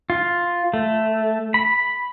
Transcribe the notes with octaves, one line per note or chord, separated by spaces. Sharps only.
F4
A3
B5